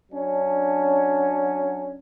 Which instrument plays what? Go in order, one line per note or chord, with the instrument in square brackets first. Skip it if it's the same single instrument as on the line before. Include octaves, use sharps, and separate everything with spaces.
[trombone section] F#3 C#4 D4